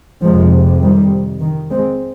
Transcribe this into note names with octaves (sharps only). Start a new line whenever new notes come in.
F2 C3 F3 G#3
D#3 G3
D#3
G#3 C4